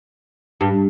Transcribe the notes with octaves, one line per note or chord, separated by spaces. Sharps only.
G2